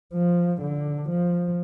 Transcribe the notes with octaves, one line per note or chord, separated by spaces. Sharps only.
F3
D3
F3